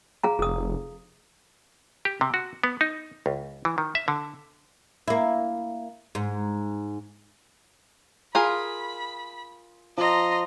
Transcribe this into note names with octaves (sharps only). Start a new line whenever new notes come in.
G#4 F5 A#5
F1 G#4 D#6
G4
C3
F#4
B3
D#4
C#2
E3
D#3
E5
D3
A#3 E4
G#2
F4 G#4 A#4 B5
F3 D#5 A#5 C6